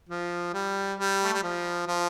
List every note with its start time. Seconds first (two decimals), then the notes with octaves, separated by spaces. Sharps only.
0.09 F3
0.53 G3
0.99 G3
1.24 A3
1.33 G3
1.43 F3
1.87 F3